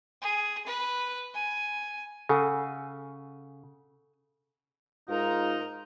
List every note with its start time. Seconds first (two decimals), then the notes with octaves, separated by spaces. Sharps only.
0.21 G#4
0.66 B4
1.34 G#5
2.29 C#3 A4 F#5 G#5
5.09 G#2 D#4 F4 A#4 A#5